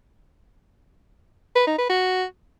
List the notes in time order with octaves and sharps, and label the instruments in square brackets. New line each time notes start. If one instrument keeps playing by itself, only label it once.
[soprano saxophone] B4
D#4
B4
F#4